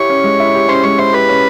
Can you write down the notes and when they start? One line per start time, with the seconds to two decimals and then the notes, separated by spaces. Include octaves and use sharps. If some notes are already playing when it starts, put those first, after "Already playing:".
Already playing: E4 G4 C#5
0.10 C#4
0.24 G#3
0.40 E4
0.55 G4
0.69 C#4 C5
0.84 G#3 C#5
0.98 E4 C5
1.13 G4 B4
1.29 C#4